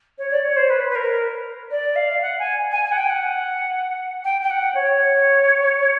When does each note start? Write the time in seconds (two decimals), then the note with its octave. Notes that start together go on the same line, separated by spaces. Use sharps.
0.18 C#5
0.30 D5
0.44 C#5
0.56 C5
0.69 B4
0.89 B4
0.95 A#4
1.70 D5
1.95 F5
2.22 F#5
2.38 G#5
2.71 G#5
2.84 G#5
2.91 F#5
2.97 G5
3.09 F#5
4.24 G5
4.41 G5
4.50 F#5
4.74 C#5